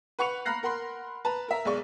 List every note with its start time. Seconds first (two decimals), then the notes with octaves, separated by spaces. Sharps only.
0.19 B4 F#5 C#6 C#7 F7
0.45 A#5 B5 F6 F#6 A#6 C7
0.63 A#4 F#5 B5 C6
1.25 B4 A5 A#5
1.48 A#4 E5 A#5
1.65 B1 G#3 D5 C#6